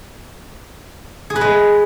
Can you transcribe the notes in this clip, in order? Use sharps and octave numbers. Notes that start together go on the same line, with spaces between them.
G#4
B4
G#3